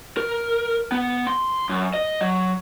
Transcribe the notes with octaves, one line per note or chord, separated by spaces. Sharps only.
A#4
B3
C6
F#2
D#5
F#3